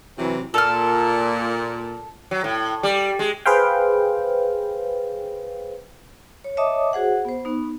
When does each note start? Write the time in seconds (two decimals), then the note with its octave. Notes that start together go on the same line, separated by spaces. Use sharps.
0.18 C3 E3 F#3
0.54 A#2 A4 F6
2.31 F#3
2.44 A2
2.83 G3
3.19 G#3
3.46 G#4 B4 C5 F5 G5
6.44 C#5
6.57 C#5 D#5 E5 A5 D6 D#6
6.93 F#4 G#4 C5 F#5
7.25 B3 C5
7.45 B3 D#4